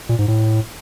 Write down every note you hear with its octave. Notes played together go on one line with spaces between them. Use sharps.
A#2
G#2
A2